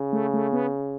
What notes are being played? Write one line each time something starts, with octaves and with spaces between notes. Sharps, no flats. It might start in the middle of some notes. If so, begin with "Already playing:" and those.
Already playing: C#3
A3
A3
B3